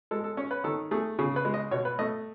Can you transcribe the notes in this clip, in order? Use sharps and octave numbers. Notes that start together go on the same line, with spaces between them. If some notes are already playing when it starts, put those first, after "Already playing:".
G#3 A4
A4
C#4 C#5
B4
D#3 A4
A3 G#4
C#3 G#4
B4
G#3
D#5
B2 C#5
B4
A3 D#5